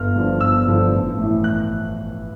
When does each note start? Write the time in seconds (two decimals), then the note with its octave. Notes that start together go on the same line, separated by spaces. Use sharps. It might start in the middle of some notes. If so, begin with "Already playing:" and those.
Already playing: G1 F6
0.16 G2 D3 F3
0.41 G1 E6
0.67 G2 D3 F3
0.93 A1
1.18 A2 E3
1.44 F#6